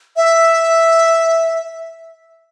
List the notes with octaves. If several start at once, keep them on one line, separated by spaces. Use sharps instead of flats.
E5